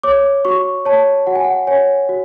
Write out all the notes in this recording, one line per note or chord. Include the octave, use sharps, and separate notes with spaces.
C#5 D6
F#4 C#6
C#5 A5
F#4 F#5
G#5
F#5
C#5 G#5
F#4